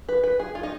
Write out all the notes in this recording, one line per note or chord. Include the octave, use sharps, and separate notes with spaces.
B4
B4
G#4
F4
D#4